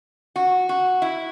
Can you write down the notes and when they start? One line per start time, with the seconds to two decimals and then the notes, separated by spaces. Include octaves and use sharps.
0.36 F#4
0.69 F#4
1.02 E4